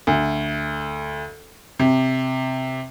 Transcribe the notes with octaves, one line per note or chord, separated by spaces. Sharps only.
D2
C3